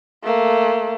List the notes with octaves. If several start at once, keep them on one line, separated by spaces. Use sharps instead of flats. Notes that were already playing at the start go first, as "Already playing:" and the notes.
A3 A#3